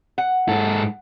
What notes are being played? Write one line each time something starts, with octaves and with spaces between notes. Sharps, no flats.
F#5
G#2 A4